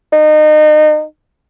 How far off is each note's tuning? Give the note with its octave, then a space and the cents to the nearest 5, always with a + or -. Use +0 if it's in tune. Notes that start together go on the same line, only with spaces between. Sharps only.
D#4 -30